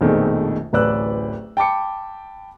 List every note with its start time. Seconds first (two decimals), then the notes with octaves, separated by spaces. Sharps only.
0.01 A#1 F2 B2 D#3 G#3 A3
0.73 D1 A1 B4 D5 E6 F#6
1.57 G5 A5 B5 D6 C#7